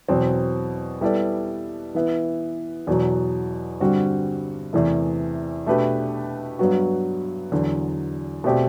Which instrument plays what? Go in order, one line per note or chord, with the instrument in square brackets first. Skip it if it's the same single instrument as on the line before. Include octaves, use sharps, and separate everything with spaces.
[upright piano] E2 B2 F#3 C4
G3 B3 E4 A4 D5
E3 B3 E4
E2 B2 F#3
G2 D3 G3 C4 F#4
E2 C3 E3 A3
B2 A3 D4 G4 B4
G2 F#3 B3 F#4
E2 D3 F#3
B2 A3 C4 G4 D5